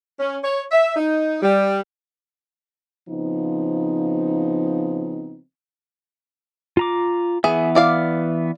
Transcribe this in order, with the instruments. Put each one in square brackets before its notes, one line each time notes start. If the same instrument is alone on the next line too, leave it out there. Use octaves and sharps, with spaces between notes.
[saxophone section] C#4
C#5
E5
D#4
G3
[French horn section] C#3 F3 B3 C4 D#4
[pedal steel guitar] F4 A#5 D6
[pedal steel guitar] E3 B3 E5 [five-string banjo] G#4
[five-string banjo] E4 D5 F5